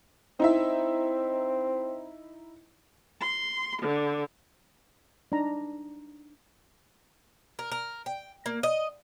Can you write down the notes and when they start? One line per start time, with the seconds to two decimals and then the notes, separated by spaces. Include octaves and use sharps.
0.40 C4 D#4 E4 E5
3.20 C6
3.81 D3
5.32 D4 D#4 A#5
7.59 A#4
7.72 A#4
8.06 G5
8.46 A#3
8.63 D#5